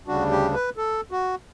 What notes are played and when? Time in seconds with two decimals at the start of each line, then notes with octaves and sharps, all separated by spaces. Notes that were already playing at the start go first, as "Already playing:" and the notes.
0.07 D2 C#3 G3 D4 F#4
0.31 G4
0.54 B4
0.77 A4
1.11 F#4